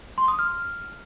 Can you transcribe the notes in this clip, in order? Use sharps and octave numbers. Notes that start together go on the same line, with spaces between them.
C6
D#6
F6